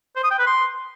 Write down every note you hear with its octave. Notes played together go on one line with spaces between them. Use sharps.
C5
D#6
G5
B4
C6